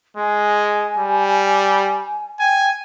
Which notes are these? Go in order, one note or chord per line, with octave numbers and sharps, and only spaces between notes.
G#3 G#5
G3
G5 G#5